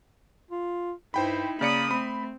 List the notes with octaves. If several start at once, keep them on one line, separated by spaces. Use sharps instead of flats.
F4
G2 D#4 E4 C5 G5 B5
C#3 A#3 D5 B5 D#6 C#7
A3 C4 B5